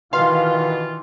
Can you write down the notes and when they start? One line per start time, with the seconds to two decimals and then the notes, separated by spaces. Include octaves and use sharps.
0.13 B2 D#3 E3 F4 F5 C6